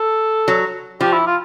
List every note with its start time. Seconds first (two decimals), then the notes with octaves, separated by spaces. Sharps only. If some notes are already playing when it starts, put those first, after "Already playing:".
Already playing: A4
0.48 F#3
1.01 F3 G4
1.13 E4
1.27 F4